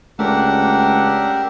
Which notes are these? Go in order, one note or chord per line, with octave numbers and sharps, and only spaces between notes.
C#2 A3 D4 G4 A#4 F#5 E6